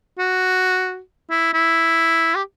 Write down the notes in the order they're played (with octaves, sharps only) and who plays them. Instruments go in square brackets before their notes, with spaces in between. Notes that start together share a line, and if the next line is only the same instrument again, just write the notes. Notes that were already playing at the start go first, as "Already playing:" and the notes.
[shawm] F#4
E4
E4
G4